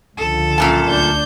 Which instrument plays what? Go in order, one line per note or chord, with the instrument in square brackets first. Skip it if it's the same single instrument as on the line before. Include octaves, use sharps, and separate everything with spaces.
[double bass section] C#2 D3 F3 [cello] A4
[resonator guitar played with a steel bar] F#2 A#2 A5
[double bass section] D2 D3 [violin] D4 G6